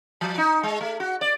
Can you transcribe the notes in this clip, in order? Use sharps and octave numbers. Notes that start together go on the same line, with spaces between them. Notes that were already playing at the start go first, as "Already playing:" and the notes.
F3
D#4
G#3
A3
F#4
D5